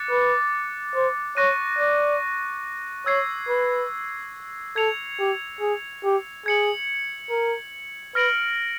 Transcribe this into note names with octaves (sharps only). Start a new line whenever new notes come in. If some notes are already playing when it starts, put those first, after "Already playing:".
Already playing: D6 F#6 A6 C#7
B4
C5
C#5 C#6 F#6 A#6 D#7
D5
C#5 E6 G#6 C7
B4
A4 G#6 C#7 F7
G4
G#4
G4
G#4 G#6 C#7 F#7
A#4
B4 F6 A#6 D7 F#7